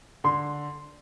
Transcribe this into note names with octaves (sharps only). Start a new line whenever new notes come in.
D3 C6